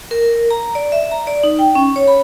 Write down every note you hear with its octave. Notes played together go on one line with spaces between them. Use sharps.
A#4
A#5
D5
E5
A#5
D5
D#4
G5
C#4
C#5
B5